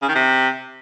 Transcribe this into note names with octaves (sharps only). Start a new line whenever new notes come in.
C#3
D#3
C3